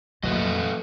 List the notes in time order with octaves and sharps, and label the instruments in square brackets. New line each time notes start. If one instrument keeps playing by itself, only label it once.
[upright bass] F2 A#2 [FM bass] F#3 [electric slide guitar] A3 B4 D#5